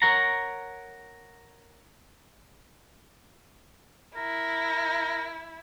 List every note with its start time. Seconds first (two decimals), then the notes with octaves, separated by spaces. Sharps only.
0.02 A#4 C#5 F#5 A#5
4.16 E4 A#4